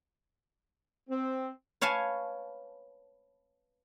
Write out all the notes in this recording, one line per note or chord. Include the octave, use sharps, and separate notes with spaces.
C4
B4 C#5 F5 G#5 A5